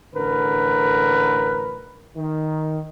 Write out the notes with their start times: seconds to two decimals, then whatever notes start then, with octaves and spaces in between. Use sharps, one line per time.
0.14 A1 D3 A#4 B4
2.16 D#3